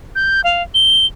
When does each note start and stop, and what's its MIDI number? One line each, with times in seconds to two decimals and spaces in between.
0.15 0.41 91
0.44 0.63 77
0.74 1.06 103